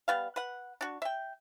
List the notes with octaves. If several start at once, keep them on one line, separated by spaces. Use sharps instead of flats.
G3 B3 F5
B4 F#5
D4 F#4
E5 G5